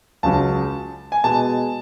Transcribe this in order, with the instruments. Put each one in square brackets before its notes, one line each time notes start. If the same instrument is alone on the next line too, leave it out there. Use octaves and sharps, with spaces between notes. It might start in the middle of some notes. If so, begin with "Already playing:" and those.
[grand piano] C#2 C#3 F#3 C#4 A5
G#5
B2 G#3 A5